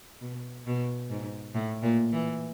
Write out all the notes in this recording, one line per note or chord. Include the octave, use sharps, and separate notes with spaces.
B2
B2
G#2
A2
A#2
E3